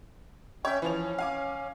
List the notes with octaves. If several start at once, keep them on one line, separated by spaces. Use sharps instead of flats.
C#4 C#5 E5 G5
E3 F3 C#4 F7
F5 G#5 D6